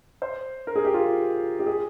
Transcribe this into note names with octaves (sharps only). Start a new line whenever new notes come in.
C5
A#4
G#4
G4
F4
G4
G#4